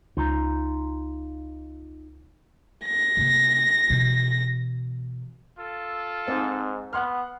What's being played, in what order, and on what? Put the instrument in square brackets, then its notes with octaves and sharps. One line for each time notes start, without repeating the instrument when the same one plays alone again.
[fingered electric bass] C#2 [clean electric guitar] D#4 F4 A#5
[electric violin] A#6
[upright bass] C3 A#3
B2 E3
[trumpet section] F4 A4
[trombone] G#2 [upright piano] C4 D#4
[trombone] B3 [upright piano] F#5 C6 F6